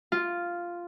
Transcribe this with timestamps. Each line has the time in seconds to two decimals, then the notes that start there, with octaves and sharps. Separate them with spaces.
0.12 F4